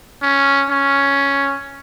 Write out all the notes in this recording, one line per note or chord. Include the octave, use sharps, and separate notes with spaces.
C#4
C#4